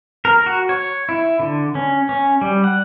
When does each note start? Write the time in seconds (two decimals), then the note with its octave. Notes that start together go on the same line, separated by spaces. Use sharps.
0.25 A#4
0.46 F#4
0.69 C#5
1.09 E4
1.40 D3
1.75 C#4
2.09 C#4
2.41 G3
2.64 F#5